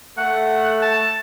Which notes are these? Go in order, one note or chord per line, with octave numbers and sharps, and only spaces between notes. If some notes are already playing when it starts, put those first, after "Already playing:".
A3 F#5
A5